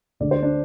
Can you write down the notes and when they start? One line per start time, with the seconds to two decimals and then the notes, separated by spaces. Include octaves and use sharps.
0.20 D2 D3 G#3 D4 D5
0.31 C5
0.43 D4 D5